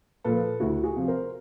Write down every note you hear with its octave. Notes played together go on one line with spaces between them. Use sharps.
A#2 F3 A4 B4
D2 E4 F#4
F#4 G#4
C3 F3
A#4 C5